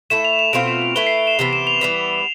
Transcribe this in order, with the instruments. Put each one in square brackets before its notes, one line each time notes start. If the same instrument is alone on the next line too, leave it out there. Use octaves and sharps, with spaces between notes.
[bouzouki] A3 E4 A4 [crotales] E7
[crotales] F7
F7
[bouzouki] B2 A3 C4 F4 [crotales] D7
[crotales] E7
F7
[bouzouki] A3 E4 B4 [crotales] G7
[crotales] C7
D7
E7
[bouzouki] C3 E3 B3 [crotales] E7
[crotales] E7
F7
[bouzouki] E3 G3 B3